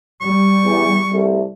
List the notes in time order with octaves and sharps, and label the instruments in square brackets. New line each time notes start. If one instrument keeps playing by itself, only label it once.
[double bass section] G3 [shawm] C#6
[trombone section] E2
C2 A3